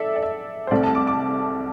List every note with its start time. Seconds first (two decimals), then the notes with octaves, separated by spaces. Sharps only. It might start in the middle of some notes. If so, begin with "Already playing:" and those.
Already playing: A4 D5 E5
0.16 D5
0.23 E5
0.67 C5
0.71 C2 C3 A3 D5
0.83 A5
0.95 D6
1.07 D6